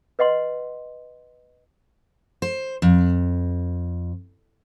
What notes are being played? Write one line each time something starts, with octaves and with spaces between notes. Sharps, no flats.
B4 D#5 F#5 C6
C5
F2